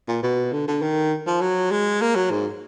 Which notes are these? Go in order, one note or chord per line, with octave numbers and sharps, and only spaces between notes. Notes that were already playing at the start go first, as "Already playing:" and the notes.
A#2
B2
D3
D3
D#3
F3
F#3
G#3
A#3
F#3
G#2